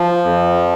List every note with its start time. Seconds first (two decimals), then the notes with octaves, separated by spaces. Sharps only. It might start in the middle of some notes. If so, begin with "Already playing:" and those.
Already playing: F3
0.24 F2